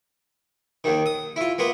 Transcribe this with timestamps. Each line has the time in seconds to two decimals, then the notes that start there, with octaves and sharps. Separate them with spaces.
0.84 D#2 D#3
1.06 D#6
1.36 E4 F4
1.59 A#3 B3 F4